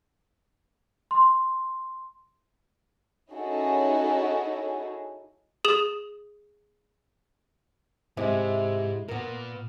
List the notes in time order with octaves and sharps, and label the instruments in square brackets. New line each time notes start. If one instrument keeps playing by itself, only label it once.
[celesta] C6
[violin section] C#4 D#4 E4 F#4 G#4 A4
[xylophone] G#4 D#6 E7 F#7
[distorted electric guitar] G#2 [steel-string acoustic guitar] C3 G#3 E4
[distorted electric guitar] A#2 [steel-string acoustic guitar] B3 A#4